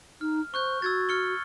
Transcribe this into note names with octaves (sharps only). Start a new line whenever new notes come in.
D#4 F6
C5 C#6 F#6 G6
F#4 E6 G#6 A6
F6 C#7 G7